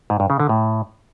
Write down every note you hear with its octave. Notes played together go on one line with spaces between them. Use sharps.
G#2
G2
C#3
D3
A2